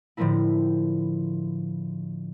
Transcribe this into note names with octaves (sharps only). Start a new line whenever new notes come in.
A2 D3 F3 A3 A#3 E4